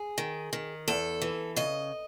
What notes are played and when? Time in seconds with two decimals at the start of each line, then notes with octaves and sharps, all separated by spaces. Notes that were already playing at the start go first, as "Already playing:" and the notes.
Already playing: G#4
0.18 D#3
0.53 D#3
0.88 E2 A4
1.22 E3
1.56 C#3 D#5